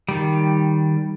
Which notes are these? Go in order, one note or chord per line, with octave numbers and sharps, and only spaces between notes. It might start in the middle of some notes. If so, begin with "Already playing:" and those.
D#3 G3